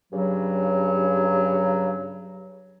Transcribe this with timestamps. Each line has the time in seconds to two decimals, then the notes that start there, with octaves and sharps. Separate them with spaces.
0.12 G2 C#3 F#3